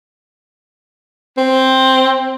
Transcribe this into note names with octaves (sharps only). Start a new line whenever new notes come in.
C4